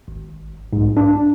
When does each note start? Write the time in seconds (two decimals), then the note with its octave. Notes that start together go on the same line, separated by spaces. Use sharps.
0.08 G#1
0.73 B1 G#2
0.97 D4